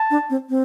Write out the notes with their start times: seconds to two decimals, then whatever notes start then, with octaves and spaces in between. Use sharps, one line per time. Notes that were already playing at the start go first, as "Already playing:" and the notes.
Already playing: A5
0.11 D4
0.30 C4
0.50 C4